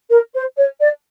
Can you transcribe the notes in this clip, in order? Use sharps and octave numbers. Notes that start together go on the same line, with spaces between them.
A#4
C5
C#5
D5